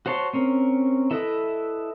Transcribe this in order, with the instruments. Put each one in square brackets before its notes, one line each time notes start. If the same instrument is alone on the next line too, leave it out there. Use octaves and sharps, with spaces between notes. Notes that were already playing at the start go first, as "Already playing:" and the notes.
[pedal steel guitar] F#4 C5 C#5 A5 C6
C4 C#4 A#4
E4 A4 B4 D#5 E5